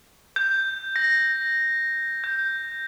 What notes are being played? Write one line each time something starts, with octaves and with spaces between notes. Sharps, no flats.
G6
A#6
G6